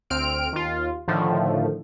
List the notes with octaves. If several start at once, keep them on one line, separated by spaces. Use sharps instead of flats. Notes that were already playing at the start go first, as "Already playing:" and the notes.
D2 C4 F6 D7
D#2 F4
A2 D3 D#3 F3 A3